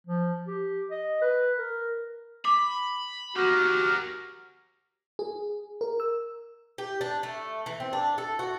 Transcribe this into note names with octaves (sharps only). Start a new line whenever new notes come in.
F3
G4
D#5
B4
A#4
B5 D6
F#4 G4 A#4 F6
G#4
A#4
E6
G4
D4
A3
E3
C4
D4
A4
F#4